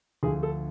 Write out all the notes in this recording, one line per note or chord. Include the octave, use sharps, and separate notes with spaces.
D2 D3 F3 G#4
A4